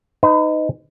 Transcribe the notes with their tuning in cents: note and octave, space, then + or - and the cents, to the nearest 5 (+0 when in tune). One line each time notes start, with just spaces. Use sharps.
D#4 +0 B4 +40